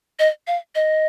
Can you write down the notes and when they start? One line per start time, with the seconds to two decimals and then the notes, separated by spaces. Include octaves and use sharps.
0.19 D#5
0.47 F5
0.75 D#5